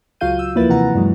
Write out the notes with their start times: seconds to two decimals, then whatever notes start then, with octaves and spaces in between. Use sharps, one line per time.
0.21 C#2 F#3 F4 F5 G6 D#7
0.39 E6
0.55 D#2 F3 A#3 E4 B4 A6
0.69 C3 E3 F#5 A#5
0.95 G2 E3 F#3 G#3